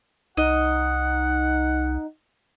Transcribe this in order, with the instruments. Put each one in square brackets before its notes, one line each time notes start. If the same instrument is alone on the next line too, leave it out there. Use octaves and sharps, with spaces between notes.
[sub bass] C2 [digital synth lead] D#4 [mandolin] D#5 [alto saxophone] F#5